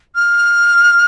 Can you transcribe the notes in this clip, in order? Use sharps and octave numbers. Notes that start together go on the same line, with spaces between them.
F6